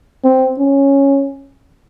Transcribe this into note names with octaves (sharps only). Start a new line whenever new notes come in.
C4
C#4